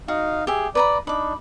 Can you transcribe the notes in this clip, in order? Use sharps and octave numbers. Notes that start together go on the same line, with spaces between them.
D#4 F#4 F5
G4 G#4 E5
B4 D5 A#5 B5
D4 D#4 B5 D6